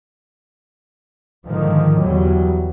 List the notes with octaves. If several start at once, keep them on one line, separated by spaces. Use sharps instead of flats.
G#2 D3 D#3 F3
E2 F#3 G3